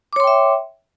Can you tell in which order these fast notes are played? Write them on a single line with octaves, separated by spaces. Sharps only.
D6 C#5 C6 G5 E5